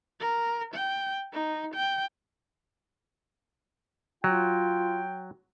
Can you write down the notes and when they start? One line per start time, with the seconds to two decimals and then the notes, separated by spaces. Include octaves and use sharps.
0.20 A#4
0.74 G5
1.33 D#4
1.75 G5
4.24 F#3 F4 G5